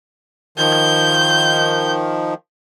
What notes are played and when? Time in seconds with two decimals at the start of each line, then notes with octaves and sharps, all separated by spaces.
0.58 D#3 F3 G6